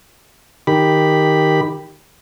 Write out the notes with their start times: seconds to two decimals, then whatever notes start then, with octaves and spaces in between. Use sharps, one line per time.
0.67 D#3 G4 B5